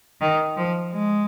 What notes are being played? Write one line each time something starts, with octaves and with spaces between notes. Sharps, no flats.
D#3
F3
G#3